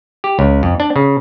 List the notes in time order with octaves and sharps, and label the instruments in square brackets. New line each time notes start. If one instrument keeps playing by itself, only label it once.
[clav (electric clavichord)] G4
C#2
F2
D4
C#3